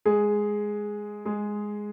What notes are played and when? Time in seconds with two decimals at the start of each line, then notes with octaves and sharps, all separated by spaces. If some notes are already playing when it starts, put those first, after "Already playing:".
0.06 G#3 G#4
1.25 G#3 G#4